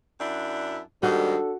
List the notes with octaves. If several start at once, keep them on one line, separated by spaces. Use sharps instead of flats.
F#2 D4 E4
D#2 G#2 G3 D4 F#4 A4